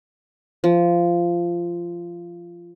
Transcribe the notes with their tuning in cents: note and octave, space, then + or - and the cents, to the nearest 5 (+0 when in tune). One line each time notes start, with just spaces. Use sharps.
F3 -15